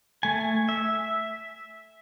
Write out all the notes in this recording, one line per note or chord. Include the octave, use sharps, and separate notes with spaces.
A3 G#5
E5